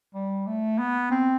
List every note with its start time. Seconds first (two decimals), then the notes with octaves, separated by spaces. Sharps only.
0.14 G3
0.47 A3
0.79 B3
1.11 C4